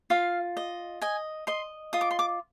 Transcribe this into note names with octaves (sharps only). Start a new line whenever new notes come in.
F4 F5
D#5
D#5 G#5
D#5 C6
F4 D#6
D6
C6
D6